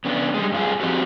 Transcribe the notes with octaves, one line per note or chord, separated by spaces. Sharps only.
C#3 B3 D4
G3 G#3
G2 F4 G#4
F3 C4 D#4 F#4 G4